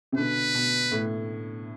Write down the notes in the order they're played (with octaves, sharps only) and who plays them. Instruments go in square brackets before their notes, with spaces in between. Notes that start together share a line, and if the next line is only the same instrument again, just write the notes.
[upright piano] C3
[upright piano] B2 D3 [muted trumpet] B4
[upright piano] B2
A2